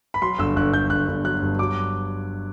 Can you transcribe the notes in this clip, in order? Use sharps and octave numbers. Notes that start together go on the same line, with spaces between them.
B5
F#3 C6
G1 E6
G1 F#6
G1 G6
G1 F#6
G1
F#3 F#6
G2
F#3 D6